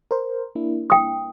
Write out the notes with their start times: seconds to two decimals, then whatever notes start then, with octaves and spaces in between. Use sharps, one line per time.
0.11 A#4 C5
0.55 A#3 D4 E4
0.90 G5 D#6